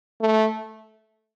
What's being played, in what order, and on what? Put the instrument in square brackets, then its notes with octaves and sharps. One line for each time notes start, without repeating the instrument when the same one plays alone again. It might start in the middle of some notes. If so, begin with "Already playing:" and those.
[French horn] A3